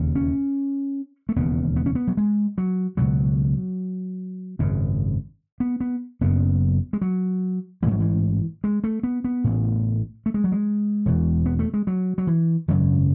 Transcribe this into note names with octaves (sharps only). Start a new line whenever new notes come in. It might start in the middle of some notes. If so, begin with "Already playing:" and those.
Already playing: E1 D#2 C#3
C#4
A3
E1 D#2 C#3 B3
B3
C#4
B3
F#3
G#3
F#3
C#2 B2 F#3
G#1 F#2 C#3
B3
B3
F#1 F#2 C#3 B3
G#3
F#3
A1 G#2 E3 F#3
E3
G#3
A3
B3
B3
A1 A2
A3
G#3
F#3
G#3
E1 E2 B2
B3
A3
G#3
F#3
F#3
E3
G#1 F#2 C#3 F#3